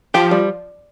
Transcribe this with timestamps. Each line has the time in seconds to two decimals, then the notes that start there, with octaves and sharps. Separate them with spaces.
0.14 F3 G4
0.31 G3